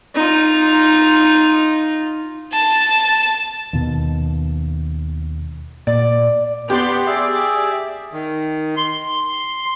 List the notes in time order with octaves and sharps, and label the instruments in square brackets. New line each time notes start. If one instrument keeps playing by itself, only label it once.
[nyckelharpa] D#4 F4
[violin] A5
[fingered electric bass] D#2 B2
[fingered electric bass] A#2 [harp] D5
[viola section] B3 D5 C6 [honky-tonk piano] G4
[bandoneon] G#4 E5 [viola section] D5
[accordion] D#3
C6